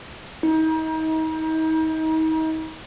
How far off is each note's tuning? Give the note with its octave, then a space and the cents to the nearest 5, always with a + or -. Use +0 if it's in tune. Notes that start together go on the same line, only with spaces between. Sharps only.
D#4 +35